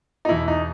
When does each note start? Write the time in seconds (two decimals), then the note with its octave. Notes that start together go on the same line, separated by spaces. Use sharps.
0.25 D#4
0.29 E2 B2 E4
0.48 D#4